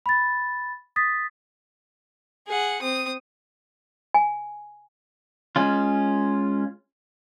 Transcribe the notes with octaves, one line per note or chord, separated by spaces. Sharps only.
B5 A6
D#6 A6 B6
G#4 F#5
C4 D#6
G#5
G#3 C#4 F4